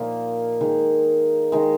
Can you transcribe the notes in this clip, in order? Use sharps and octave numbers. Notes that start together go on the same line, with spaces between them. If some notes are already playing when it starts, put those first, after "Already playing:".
Already playing: A#2 F3 A#3 D#4
D#3 G#3
D#3 G#3